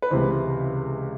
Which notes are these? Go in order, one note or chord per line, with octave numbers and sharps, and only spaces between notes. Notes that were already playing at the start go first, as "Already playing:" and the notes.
B4
C#2 C3 E3 C5